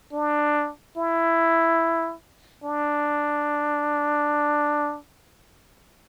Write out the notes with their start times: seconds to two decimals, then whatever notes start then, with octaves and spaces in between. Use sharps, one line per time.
0.13 D4
0.97 E4
2.64 D4